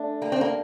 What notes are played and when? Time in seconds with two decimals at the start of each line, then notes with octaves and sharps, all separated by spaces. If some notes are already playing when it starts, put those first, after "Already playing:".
Already playing: A3 D4
0.22 A#3 G4
0.32 C4
0.41 A#3